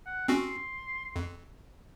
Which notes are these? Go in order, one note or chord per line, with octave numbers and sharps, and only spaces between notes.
F#5
C4 C#4 F#4 C6
F2